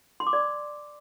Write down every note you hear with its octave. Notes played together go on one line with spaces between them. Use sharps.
C6
D6
D5